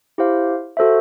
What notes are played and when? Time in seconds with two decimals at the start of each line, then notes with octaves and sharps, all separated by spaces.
0.18 E4 G4 C5 F5
0.77 F#4 A4 C5 E5